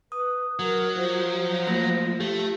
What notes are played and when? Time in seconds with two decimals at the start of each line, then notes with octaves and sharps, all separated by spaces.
0.12 B4 D#6
0.59 F#3 A#4
0.95 F3 C5
1.67 A3 A#3 A#6
2.20 A3 G4